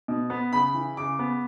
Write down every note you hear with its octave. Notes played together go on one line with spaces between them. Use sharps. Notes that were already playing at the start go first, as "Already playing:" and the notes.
B2
B3
C#3 B5
E3
C#3 D6
B3